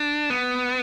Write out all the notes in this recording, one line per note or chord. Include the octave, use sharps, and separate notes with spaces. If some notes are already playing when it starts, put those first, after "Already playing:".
Already playing: D4
B3